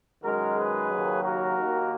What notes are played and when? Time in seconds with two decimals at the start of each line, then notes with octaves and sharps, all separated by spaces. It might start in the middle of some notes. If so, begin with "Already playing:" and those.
0.23 F#2 D#3 G#3 F#4 A#4
0.56 G#4 B4
0.90 D#2 C#3 F#3 A#3
1.23 F#4 A#4
1.57 D#2 D#3 A#3